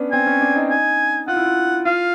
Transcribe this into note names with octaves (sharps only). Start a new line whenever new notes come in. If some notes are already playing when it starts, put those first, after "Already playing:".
Already playing: B3 C#4 D4
C4 G#5
C#4
D4
D#4
G#5
F4 F#5
E4
F4
F4 F5